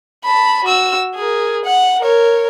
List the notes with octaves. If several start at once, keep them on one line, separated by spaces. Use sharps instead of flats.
A5 B5
F#4 E6
G#4 A#4
F#5
A#4 C#5